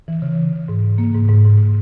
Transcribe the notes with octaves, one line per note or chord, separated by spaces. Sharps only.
E3
C#3
E3
C#3
G#2
G#2
A#3
G#2
G#2
G#2